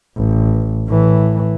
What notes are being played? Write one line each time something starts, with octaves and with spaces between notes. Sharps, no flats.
A1
A2 E3